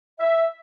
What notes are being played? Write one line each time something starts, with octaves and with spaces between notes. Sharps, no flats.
E5